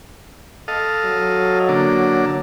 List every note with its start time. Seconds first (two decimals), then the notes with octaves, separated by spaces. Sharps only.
0.68 A4 D#5 F5
1.05 F#3
1.69 D3 A#3 D4